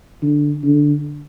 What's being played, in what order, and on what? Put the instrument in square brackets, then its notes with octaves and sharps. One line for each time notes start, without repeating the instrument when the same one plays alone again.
[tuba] D3
D3